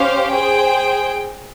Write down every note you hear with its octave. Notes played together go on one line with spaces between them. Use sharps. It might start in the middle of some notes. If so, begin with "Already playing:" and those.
Already playing: C#4 G4 C5 F5
G#4 C5 G5